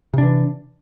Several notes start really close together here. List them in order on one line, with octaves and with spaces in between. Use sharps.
C3 D4 E3